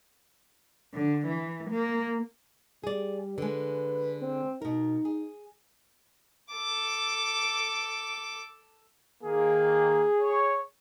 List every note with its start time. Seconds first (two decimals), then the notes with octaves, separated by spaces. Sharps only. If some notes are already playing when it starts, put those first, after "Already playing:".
0.94 D3
1.27 E3
1.70 A#3
2.84 G3 G#4 D5
3.38 D3 G#3 B4
4.22 C4
4.62 B2 D#4 A#4
5.05 G#4
6.52 A4 D6
9.24 D#3 A#3 G#4
10.21 C#5